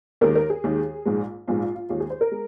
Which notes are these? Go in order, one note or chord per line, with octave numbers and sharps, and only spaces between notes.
D#2 D#3 G#3 A#4
A#4
G#4
D#2 D#3 G#3
A#1 G#2 G#3
A#1 G#2 G#3 F4
F4
F4
D#2 D#3 G#3 F4
G#4
C5
A#4
G#3